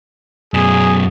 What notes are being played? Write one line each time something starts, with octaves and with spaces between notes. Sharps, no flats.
F#2 B2 G#4